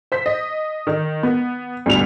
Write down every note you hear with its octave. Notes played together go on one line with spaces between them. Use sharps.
C5 B6
D#5
D#3
B3
D2 G2 B2 F7